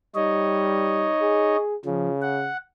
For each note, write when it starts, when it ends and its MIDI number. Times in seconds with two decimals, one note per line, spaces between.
0.15 1.12 55
0.15 1.57 63
0.15 1.57 73
0.15 1.57 75
1.21 1.76 68
1.85 2.50 49
1.85 2.09 53
2.22 2.57 78